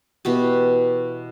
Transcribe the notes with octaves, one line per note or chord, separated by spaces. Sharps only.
B2 E3 G4